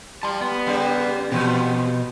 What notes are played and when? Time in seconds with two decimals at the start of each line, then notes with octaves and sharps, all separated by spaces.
0.23 G3 A5 C6
0.41 B3
0.67 C#3 G3 A#3
1.32 E2 B2 F3 G4